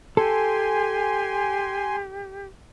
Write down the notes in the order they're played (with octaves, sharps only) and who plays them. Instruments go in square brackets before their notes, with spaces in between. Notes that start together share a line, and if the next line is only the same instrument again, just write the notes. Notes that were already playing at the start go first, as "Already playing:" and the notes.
[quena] G4 [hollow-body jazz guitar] A4 [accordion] G#5 C6